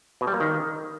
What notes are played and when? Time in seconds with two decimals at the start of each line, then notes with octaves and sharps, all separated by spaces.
0.21 B2
0.27 G3
0.34 A#3
0.40 D#3